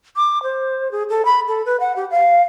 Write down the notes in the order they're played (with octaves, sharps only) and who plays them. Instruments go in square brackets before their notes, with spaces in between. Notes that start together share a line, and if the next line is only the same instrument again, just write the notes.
[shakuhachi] D6
C5
G#4
A4
B5
A4
B4
F#5
G4
F5